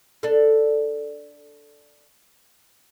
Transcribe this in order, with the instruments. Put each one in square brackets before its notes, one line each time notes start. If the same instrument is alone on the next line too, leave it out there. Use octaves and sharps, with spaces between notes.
[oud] D4 A4